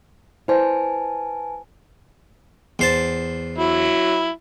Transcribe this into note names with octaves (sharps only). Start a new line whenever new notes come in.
E4 B4 C5 D5 G#5 A5
E2 C5 A5
F#3 E4